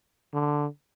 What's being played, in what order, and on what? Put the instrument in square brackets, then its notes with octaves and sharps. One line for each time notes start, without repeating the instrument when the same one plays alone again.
[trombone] D3